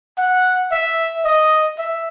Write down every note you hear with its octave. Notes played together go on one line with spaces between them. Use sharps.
F#5
E5
D#5
E5